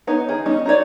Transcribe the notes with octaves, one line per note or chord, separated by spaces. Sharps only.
B3 D#4 C#5
D#3 G#4
G3 B3 C#4 D#4
D#4 F#4 A4 C#5 D5